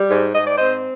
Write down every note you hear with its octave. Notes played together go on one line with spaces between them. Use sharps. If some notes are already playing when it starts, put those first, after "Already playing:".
Already playing: G3
G#2
G#2 D#5
D5
C4 C5 D#5